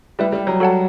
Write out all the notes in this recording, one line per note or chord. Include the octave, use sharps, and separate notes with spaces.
G3 A3 E4 B4 E5
G3
F#3
F#4 A4 C#5 F#5 A5